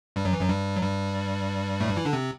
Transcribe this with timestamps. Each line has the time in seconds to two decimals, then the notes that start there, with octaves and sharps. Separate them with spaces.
0.16 G2 G3
0.25 F#2 F#3
0.33 E3
0.40 F#2 F#3
0.49 G2 G3
0.76 F#3
0.82 G2 G3
1.80 A2 A3
1.89 G2 G3
1.96 E3 E4
2.05 D3 D4
2.13 C3 C4